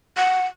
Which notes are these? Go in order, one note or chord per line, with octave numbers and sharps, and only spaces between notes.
F#5